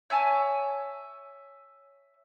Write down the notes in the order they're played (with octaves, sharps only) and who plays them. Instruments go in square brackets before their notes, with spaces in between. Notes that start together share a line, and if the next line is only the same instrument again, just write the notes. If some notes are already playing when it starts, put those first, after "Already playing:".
[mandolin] C#5 E5 G#5 A5